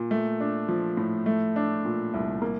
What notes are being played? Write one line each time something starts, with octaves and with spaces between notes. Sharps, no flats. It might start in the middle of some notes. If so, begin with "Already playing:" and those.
Already playing: A#2
A3
D4
F3
A2
A3
D4
A#2
C2
A#3